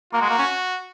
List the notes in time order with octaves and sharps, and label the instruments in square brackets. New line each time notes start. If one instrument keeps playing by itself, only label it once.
[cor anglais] A#3 [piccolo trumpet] F#4
[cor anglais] G#3
A#3
C#4